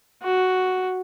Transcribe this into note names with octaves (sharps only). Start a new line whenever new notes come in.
F#4